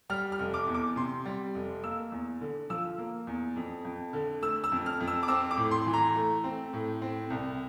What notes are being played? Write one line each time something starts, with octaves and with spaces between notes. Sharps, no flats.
G3 F6
F6
F1
D6
E2
D6
C3 C6
G3
F1
A#3 E6
E2
D3
F3 E6
A#3
E2
F2
F2
D3
A3 E6
E6
F2
F6
F2
E6
D6
C4 E6
D6
A2
C6
E3
A#5
A3
C4
A2
C4
C2